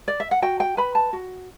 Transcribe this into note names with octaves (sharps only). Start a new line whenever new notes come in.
D5
E5
F#5
F#4 G5
G5
B4 B5
A5
F#4